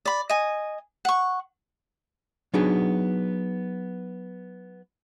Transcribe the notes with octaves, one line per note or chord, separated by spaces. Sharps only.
D5 B5
D#5 G#5
F#5 C#6
F#3 B3 D4 D#4 G#4